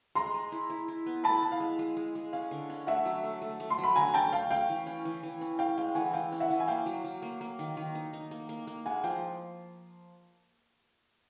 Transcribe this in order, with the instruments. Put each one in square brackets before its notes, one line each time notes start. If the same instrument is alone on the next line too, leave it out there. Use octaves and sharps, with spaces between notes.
[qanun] G#3 [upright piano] A#5 C6
[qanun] G#3
E4
E4
E4
B3
[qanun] E4 [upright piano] A5 B5
[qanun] E4
[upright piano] F5
[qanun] G#3
G#3
G#3
G#3
[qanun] C#4 [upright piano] F5
[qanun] D3
C#4
[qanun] A3 [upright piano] E5 F#5
[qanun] F#3
A3
A3
A3
[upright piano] C6
[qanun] F#3
[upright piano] B5
[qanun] D3 [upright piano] G#5 A#5
[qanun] C#4 [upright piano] G5 A5
[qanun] C#4 [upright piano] F5 G5
[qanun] C#4 [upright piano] F5 G5
[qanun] E3
C#4
E3
E3
C#4
[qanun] C#4 [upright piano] F5 G5
[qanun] G#3 [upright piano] F5 G5
[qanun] E3 [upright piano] F#5 G#5
[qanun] E3 [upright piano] F5 G5
[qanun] C#4
[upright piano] E5 F#5
[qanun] E3
[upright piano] G#5
[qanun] A#3 [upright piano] F5 G5
[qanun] F#3
F#3
A#3
A#3
D#3
D#3
D#4
D#4
A#3
A#3
A#3
[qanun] G#3 [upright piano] F#5 G#5
[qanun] F3 [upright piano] F5 G5